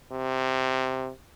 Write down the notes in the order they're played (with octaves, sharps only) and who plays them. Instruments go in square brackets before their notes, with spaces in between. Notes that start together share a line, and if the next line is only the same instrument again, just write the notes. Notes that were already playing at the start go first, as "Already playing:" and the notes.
[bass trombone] C3